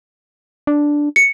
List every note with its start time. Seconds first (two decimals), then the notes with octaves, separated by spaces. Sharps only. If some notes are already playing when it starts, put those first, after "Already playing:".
0.67 D4
1.16 C#7